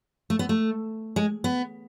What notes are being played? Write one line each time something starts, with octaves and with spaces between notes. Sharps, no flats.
A3
B3
A3
G#3
B3